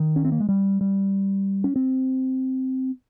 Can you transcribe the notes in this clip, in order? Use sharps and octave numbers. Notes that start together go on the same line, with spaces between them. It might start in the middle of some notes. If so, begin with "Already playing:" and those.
Already playing: D#3
C#4
C4
A#3
G#3
G3
G3
C#4
C4